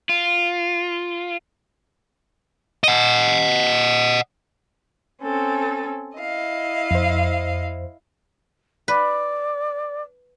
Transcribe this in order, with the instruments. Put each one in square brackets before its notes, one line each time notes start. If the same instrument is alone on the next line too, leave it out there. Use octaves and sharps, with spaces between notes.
[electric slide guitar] F4
[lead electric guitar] D#5 F#5
[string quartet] C4 C#4 A4
E4 D#5 F5
[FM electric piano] F2 C5
[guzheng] B4 [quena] D5